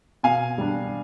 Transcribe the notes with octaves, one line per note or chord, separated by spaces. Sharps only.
B2 F5 G#5
G3 D4